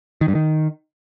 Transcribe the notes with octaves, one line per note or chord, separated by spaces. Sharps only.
D#3
G2
D#3